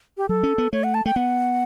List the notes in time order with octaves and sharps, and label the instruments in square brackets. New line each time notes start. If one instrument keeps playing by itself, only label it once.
[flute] G4
[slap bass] F#3 [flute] A4
[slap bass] C#4
B3
[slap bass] A3 [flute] C#5
[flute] F#5
A5
[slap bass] A3 [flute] G5
[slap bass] B3 [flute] F#5